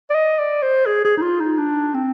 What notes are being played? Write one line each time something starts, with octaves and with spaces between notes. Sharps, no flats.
D5
D#5
D5
C5
G#4
G#4
D#4
F4
D#4
D4
C4